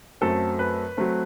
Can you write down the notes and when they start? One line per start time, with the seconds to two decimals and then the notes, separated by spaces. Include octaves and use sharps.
0.21 F#2 F#3 A3 C4 A4
0.59 B4
0.97 F#3 A3 C4